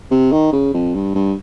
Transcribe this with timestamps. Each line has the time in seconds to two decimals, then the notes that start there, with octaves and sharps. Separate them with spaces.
0.11 C3
0.32 D#3
0.52 C#3
0.74 F2
0.95 G2
1.15 G2